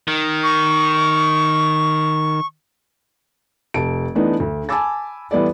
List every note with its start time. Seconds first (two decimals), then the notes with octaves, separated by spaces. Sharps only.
0.08 D#3
0.43 C#6
3.74 F1 A5 D7
4.15 E3 A3 B3 D4 D#4
4.40 D2
4.69 G#5 A5 B5 D6 E6 A6
5.31 E3 G3 B3 E4 A4 D5